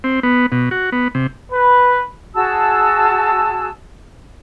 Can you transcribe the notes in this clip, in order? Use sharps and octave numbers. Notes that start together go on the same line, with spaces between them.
C4
B3
B2
F#4
B3
C3
B4
F#4 G#4 A5 E6